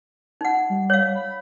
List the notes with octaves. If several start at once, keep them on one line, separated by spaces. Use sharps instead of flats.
D#4 F#5
G3
C#5 F5
B5